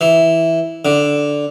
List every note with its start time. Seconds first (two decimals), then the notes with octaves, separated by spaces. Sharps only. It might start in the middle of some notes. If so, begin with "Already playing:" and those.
0.01 E3
0.85 D3